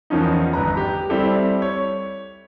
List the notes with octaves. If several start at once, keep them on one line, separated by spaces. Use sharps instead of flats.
E2 D#3 F3 C#4 D#4
G1 B4 A#5
G4
G3 C4 E4 G4 A4
C#5